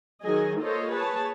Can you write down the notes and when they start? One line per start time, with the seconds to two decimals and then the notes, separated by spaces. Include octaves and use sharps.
0.22 D#3 F#3 F#4 G#4 D#5 G#5
0.59 A#3 F4 A4 C5 C#5 D#5
0.92 G#4 B4 C#5 A5